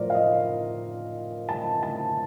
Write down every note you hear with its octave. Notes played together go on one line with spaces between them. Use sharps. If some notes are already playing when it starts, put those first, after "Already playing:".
Already playing: A2 F3 A#4 C5 D5
F5
D#5
A5
A5